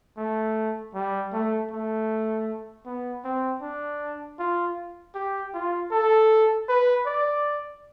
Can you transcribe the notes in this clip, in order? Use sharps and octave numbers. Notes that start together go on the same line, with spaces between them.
A3
G3
A3
A3
B3
C4
D4
F4
G4
F4
A4
B4
D5